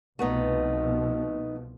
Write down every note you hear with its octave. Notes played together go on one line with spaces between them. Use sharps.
C2 B2 F3 A3 B3 D#4